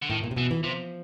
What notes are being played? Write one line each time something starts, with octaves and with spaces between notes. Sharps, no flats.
D3
A2 D#3
A#2
C3
B2 E3
E3
C3 F3